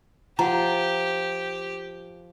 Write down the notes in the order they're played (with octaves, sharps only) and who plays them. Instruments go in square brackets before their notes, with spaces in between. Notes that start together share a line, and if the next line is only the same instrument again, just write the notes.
[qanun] F3 [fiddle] G4 [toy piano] F#5 A#5